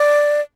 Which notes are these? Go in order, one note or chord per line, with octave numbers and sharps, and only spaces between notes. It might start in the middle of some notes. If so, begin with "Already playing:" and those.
Already playing: D5